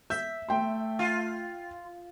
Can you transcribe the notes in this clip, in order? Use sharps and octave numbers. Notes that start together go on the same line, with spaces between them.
E5 G6
A3 G5 C6
F4